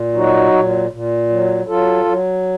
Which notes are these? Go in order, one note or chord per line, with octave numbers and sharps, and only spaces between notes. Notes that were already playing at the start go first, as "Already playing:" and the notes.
Already playing: A#2
F#3 D#4 F#4
A#2
A#2
F#3
F#3 F4 A4
F#3